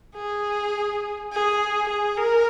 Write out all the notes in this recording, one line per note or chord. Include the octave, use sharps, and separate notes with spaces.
G#4
G#4
G#4
A#4